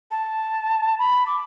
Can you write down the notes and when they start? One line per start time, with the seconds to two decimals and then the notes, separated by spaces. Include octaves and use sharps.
0.11 A5
0.99 B5
1.26 D6